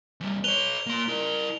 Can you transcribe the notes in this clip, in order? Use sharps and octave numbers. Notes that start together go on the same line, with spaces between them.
E2 G3
B4 C#5 F7 G7
A#3 C6
E4 A#4